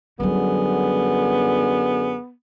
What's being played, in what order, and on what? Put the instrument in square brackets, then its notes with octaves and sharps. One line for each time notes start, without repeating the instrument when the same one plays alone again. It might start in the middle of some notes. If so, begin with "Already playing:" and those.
[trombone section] F#2 D3 G#4 [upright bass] F#3 G3 [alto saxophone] B3